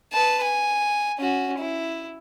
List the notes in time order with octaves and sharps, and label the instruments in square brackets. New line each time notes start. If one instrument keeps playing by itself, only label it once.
[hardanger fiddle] B4 A5
G#5
C#4 F#4
E4